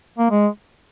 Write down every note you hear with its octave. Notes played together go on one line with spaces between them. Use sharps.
A#3
G#3